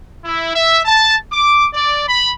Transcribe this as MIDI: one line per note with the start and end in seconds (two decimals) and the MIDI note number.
0.25 0.52 64
0.55 0.80 76
0.85 1.14 81
1.32 1.66 86
1.74 2.03 74
2.07 2.30 83